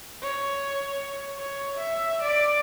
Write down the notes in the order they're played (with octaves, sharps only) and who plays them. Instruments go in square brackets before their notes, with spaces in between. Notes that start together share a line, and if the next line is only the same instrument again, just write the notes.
[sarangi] C#5
C#5
E5
D5